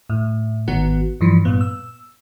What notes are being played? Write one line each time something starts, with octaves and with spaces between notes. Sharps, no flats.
A2
G#1 D#3 B3 F#4
G2 E3 F3
G2 A#2 B3
E6